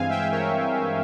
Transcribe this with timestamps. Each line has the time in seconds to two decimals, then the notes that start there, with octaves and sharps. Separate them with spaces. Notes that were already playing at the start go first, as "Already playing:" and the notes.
Already playing: G2 E3 G#3 C4 F5 G#5
0.09 E5 G5
0.32 A#4 C#5